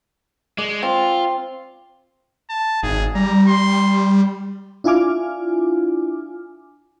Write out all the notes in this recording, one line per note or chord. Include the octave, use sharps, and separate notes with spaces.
G#3 D5
C4 F4
A5
G#1 G#4
G3 A#5
C6
D4 E4 F4 G#5 D6 F6